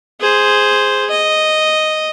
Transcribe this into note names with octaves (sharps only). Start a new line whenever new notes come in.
G#4 C5
D#5